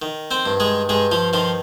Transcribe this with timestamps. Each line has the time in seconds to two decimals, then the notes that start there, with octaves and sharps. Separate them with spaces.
0.02 D#3
0.31 C4 C5
0.46 G2
0.60 G#3 G#4
0.89 G2 G#3 G#4
1.11 F3 F4
1.33 D#3 F3 F4